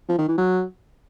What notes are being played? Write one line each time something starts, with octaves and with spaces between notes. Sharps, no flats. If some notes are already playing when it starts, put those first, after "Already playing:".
F3
D#3
E3
F#3